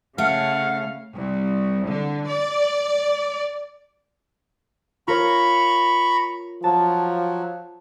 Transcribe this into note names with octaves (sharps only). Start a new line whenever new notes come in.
C#3 A3 F5 F#5
C2
D3
D5
F4 A#4 C#5 A#5 B5 C#6
F3 F#3 A5